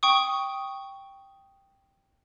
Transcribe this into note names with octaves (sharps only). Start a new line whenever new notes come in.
G5 C#6 D#6